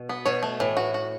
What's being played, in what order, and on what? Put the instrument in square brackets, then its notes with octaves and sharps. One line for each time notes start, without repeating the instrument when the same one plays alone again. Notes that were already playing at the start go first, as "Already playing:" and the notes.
Already playing: [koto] B2
[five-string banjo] B3
[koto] B2 [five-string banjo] C#5
[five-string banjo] A3
[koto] A2 [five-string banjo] E3
[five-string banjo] F#4
F#4